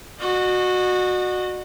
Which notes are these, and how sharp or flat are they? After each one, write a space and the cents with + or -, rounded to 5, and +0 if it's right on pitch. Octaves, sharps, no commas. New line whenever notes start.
F#4 -15 D#5 -45